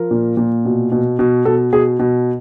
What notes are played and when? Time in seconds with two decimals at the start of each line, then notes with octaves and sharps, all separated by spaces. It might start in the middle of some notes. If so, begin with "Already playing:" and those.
Already playing: F3 A#4
0.11 A#2
0.37 A#2
0.65 B2
0.92 B2
1.19 B2
1.45 B2 A4
1.73 B2 G#4
1.99 B2